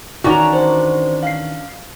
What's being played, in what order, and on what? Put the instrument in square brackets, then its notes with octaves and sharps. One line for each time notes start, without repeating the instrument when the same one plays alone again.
[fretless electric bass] D#3 E3 [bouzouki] C#4 D4 A#5 [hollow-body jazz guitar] F#4
[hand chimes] C5
F5 C7